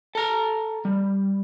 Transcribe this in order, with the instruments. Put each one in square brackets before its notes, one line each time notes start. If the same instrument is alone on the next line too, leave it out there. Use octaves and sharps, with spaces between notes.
[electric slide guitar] A4 A#5
G3